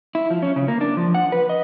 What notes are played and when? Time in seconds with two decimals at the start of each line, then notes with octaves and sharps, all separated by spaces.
0.15 E4
0.30 F3
0.42 C#4
0.56 C#3
0.68 A#3
0.81 D4
0.97 F3
1.14 F#5
1.32 B4
1.49 D#5